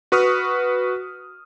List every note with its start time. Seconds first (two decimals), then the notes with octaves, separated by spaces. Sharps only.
0.12 F#4 B4 C#6 D#6 F6